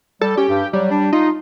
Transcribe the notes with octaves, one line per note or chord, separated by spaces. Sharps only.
G3 A4
C#4 G4
G2
F#3 G3
D4
D#4 F4